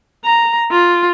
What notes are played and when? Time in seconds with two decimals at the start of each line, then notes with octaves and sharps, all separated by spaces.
0.25 A#5
0.71 F4